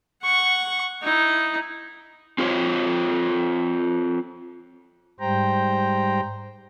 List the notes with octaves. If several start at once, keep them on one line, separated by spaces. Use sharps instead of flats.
F#5 C#6
D#4 E4
C4 F4 G#4 A4 C5 C#5
G#2 G3 C5 G5 A#5